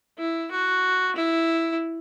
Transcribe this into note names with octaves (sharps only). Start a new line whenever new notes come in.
E4
F#4
E4